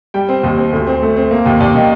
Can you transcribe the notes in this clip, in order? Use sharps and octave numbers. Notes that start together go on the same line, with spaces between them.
G3 G5
C4
D#2
C4
D2
C4
A3
C4
A#3
D#2
D#2 D5
D#3